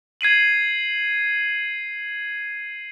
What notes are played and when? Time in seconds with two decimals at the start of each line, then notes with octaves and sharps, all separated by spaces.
0.21 G#6 C7 D#7 F#7